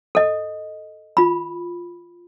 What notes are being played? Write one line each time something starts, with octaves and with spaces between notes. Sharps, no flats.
A4 D#5
F4 B5